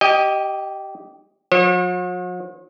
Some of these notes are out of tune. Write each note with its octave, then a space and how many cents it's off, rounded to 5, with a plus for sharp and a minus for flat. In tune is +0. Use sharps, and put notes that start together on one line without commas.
G4 -15 D#5 +0 G5 +35
F#3 -45 C#5 -45